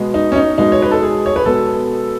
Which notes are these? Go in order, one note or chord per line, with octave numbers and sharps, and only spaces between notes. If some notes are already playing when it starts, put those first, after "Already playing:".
Already playing: B2 G#3 B3
D#4
C#4
D#4
B2 G#3 B3 D#4
C#5
B4
A4
G#4
C#5
B4
B2 G#3 B3 A4